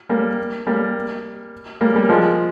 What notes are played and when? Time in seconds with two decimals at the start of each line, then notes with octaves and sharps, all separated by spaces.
0.09 G3 A#3
0.67 G3 A#3
1.81 G3 A#3
1.95 G3 A#3
2.09 F3 G#3